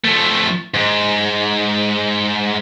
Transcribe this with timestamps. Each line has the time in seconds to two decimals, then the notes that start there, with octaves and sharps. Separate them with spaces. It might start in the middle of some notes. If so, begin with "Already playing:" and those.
0.05 F3 A3
0.74 G#2